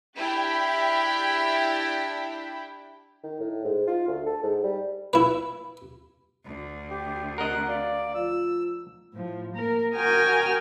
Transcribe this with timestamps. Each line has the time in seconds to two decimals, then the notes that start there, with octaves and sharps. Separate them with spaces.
0.16 D4 E4 G4 G5
3.23 D#3
3.40 A2
3.64 G#2
3.87 F4
4.08 D2
4.26 A4
4.43 G#2
4.63 G3
5.13 E4 B4
6.45 D2
6.90 G4
7.38 C3 A#4 D#5 F#5 F#6
7.68 D5 F5
8.15 F3 F4 E6
9.13 A2 F3
9.53 A#3 A#4
9.95 F#4 A#4 G5 G#5 D#6 F6